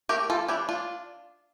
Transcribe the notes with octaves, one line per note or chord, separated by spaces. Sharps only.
A3 G4 A#4
E3 F4 A4
D4 E4 G4
D4 F4